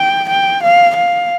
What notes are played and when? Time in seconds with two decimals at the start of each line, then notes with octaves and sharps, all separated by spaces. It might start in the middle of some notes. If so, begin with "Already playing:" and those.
Already playing: G5
0.29 G5
0.63 F5
0.96 F5